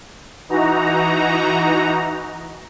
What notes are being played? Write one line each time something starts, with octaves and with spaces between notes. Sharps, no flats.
E3 D#4 F#4 A#5